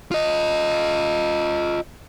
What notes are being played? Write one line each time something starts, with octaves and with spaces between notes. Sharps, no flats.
F4 D#5